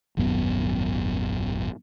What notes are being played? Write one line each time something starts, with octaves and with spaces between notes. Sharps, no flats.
D#1 G#1 F#2 B3